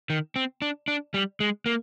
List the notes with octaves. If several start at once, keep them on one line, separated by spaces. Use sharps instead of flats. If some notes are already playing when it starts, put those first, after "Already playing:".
D#3
C4
D4
D4
G3
G#3
A#3